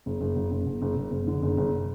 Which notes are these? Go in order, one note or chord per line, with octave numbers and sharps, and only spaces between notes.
F#1
F#1
F#1
F#1
F#1
F#1
F#1
F#1
D3
F#1
F#1